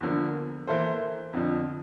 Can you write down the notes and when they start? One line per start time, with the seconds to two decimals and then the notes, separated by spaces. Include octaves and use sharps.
0.01 E2 D3 F3 A#3
0.67 E3 A#3 E4 A4 C5
1.33 F2 D3 F3